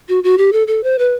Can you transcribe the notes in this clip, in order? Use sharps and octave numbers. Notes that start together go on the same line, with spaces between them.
F#4
F#4
G4
A4
A4
C5
B4